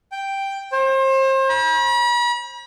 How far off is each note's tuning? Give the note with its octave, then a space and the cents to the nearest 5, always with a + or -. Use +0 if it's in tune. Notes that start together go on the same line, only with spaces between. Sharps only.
G5 +0
C5 +35
B5 -45